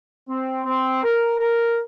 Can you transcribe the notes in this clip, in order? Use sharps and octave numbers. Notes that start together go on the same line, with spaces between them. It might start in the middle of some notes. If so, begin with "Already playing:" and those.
C4
C4
A#4
A#4